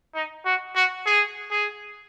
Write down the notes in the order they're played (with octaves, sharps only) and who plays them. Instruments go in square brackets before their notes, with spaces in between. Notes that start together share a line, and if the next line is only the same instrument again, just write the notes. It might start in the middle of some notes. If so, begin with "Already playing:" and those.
[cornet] D#4
F#4
F#4
G#4
G#4